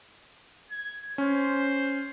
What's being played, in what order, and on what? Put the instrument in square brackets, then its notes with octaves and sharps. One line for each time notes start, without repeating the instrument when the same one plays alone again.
[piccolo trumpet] G#6
[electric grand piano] C#4 [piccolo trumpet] C5